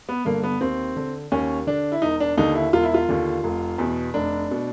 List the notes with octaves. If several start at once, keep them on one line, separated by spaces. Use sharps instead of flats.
B3
G2 D3 A#3
B3
D#2 C4
D3
D#2 C#4
D3 D4
E4
E1 D#4
D4
D#2 D3 D#4
E4
E1 F4
E4
F4
D#2 D3
F1
E2 B2
F1 D4
B2